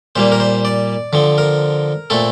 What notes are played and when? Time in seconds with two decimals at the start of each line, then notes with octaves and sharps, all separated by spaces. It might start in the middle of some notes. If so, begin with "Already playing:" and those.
0.16 A#2 G3 A#3 C5
0.32 A#4
0.40 C5
0.65 D5
1.13 D3 F3 C4
1.38 A#4
2.10 A#2 A3 C4 A4